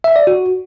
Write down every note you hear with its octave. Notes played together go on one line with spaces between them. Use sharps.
E5
D5
F#4